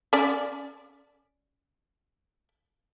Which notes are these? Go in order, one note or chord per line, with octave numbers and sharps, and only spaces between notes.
C#4 D5